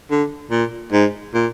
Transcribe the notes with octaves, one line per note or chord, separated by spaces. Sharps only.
D3
A#2
G#2
A#2